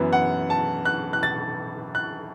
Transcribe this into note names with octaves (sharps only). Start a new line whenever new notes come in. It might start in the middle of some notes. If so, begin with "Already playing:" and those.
Already playing: F#2 E3 B3
F#5
A5
F#6
F#6
A6
F#6